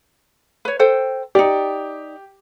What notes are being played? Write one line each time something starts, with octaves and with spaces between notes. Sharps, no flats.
B4 C#5
A4 C5 G5
D#4 G4 D5